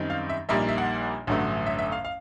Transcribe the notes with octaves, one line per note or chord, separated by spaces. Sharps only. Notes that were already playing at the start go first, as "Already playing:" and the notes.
Already playing: F#2 D#3 G3 C4 D#4
F5
E5
A#1 A#2 G3 A#3 D#4 E5
E5
F#5
A1 G2 D3 F#3 A3
E5
E5
F5
F5